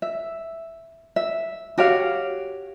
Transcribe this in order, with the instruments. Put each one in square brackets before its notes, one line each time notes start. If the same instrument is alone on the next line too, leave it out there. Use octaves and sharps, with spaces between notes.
[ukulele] E5
E5
F#4 G4 C#5 F5